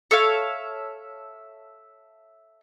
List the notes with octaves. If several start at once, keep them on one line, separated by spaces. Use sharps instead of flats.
A4 C#5 E5 F5